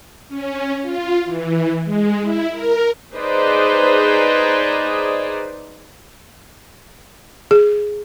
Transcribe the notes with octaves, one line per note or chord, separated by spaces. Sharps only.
C#4
F4
E3
G#3
E4
A#4
D#4 G#4 B4 C5 D5 D#5
G#4